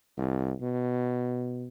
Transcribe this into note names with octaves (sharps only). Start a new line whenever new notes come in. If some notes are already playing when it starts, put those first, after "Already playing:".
C2
B2